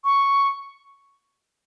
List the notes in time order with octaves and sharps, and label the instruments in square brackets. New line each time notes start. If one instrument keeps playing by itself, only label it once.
[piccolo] C#6